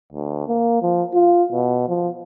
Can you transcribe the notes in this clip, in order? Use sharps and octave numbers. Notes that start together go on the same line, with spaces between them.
D2
A#3
F3
F4
B2
F3